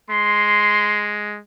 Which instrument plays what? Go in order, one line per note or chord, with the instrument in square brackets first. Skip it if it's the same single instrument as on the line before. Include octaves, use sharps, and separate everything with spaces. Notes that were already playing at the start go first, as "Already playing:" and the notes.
[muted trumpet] G#3 [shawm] C6